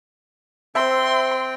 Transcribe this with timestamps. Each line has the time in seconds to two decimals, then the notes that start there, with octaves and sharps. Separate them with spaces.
0.75 C4 C5 E5 G5 C6